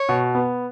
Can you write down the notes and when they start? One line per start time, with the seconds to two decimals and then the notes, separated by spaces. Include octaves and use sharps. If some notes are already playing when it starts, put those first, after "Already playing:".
Already playing: C#5
0.09 B2
0.35 B3